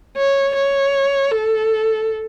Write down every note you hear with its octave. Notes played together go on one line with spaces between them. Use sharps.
C#5
C#5
A4